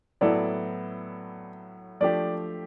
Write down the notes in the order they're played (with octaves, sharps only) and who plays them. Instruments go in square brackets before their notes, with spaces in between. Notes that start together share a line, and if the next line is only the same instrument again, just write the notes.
[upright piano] A2 F#3 B3 E4 A4 [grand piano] D5
[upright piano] F3 A3 D4 G4 [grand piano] D5